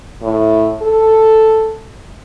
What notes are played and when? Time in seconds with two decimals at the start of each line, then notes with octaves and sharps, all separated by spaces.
0.23 A2
0.82 A4